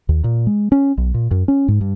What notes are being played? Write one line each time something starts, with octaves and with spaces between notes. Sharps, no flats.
D#2
A#2
G#3
C#4
B1
A#2
F#2
C#4
G#2
G2